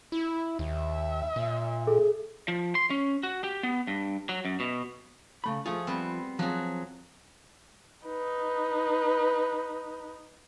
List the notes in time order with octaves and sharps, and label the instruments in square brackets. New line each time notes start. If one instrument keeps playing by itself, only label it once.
[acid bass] E4
[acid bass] D#2 [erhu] E5
[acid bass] A#2
[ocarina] G#4 [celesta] A4
[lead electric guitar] F3
C6
C#4
F#4
G4
B3
G2
F#3
F#2
B2
[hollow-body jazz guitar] C#3 A3 B5
[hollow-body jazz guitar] F3 A3 F4 [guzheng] G#4
[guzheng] G3 B3 C4
[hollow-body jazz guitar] F3 C4 [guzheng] F#3 G#4
[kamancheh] D#4 B4